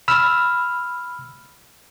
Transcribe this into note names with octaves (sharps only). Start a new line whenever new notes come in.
B5 E6 F6